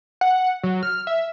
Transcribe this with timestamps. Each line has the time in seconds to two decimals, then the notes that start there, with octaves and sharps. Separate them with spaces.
0.21 F#5
0.63 F#3
0.83 F6
1.07 E5